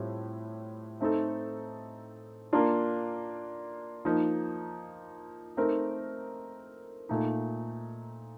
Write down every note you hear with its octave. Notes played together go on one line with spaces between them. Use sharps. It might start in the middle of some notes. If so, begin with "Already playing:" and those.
Already playing: A2 G3 C4 F4
A3 C4 D#4 A4
A#3 D4 F4
F3 A#3 D#4
A3 C4 D#4 A#4
A#2 A3 D#4